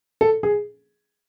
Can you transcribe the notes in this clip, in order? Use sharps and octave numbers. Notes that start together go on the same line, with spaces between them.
A4
G#4